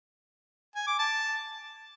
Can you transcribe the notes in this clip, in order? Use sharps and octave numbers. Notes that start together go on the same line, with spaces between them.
G#5
D6
A5